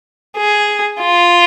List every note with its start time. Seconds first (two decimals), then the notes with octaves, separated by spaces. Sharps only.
0.37 G#4
1.01 F4